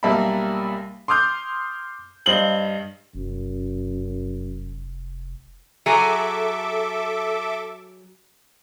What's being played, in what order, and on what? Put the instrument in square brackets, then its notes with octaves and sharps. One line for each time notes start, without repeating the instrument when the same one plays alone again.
[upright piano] B1 G3 A#3 E5 A5 B5
C6 D6 D#6 F6 G6
G2 C5 D#5 F5 F#7 G7
[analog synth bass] F1 [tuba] F#2
[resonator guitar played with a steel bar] F#3 G#4 [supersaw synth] A4 E5 D6